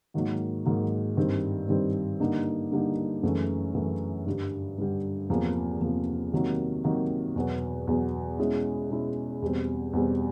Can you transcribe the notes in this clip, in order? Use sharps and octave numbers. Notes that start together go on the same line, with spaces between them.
G#2 D#3 F#3 A#3
G#2 D#3 F#3 A#3
G2 D#3 G3 C4
G2 D#3 G3 C4
D3 G3 A#3 D#4
D3 G3 A#3 D#4
F#2 C#3 E3 A3
F#2 C#3 E3 A3
G2 D3 G3
G2 D3 G3
E2 C3 F3 A#3
E2 C3 F3 A#3
C3 D#3 F#3 A#3
C3 D#3 F#3 A#3
E2 B2 F#3 B3
E2 B2 F#3 B3
B2 G#3 C#4 E4
B2 G#3 C#4 E4
E2 B2 G3 C4
E2 B2 G3 C4